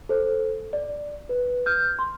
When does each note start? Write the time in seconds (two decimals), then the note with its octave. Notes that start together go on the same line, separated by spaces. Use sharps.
0.09 A4 C5
0.73 D5
1.29 B4
1.66 F6 G6
1.99 C6